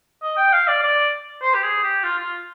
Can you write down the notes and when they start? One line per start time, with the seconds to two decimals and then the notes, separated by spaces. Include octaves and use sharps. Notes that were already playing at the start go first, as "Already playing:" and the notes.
0.23 D#5
0.37 G5
0.52 F5
0.68 D5
0.82 D5
1.42 C5
1.54 G4
1.63 G#4
1.83 G4
2.03 F4
2.18 F4